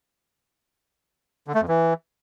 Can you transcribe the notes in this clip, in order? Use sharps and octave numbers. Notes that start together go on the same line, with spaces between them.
D3
A3
F2
E3